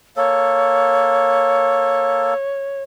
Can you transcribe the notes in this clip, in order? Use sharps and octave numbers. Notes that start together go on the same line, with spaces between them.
A#3 A4 C#5